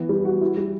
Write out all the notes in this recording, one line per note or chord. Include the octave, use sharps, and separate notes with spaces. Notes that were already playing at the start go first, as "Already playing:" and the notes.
Already playing: E3 B3
G3
F#4
E4
G3